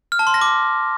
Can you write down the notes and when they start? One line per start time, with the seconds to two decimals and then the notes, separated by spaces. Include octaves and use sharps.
0.12 F6
0.19 A5
0.27 C6
0.34 A#6
0.41 D6